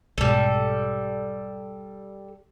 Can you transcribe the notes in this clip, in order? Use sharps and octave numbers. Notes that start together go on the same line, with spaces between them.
B1 G#2 G3 A4